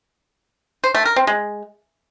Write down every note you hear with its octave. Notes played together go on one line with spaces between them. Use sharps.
C5
A3
A#4
C4
G#3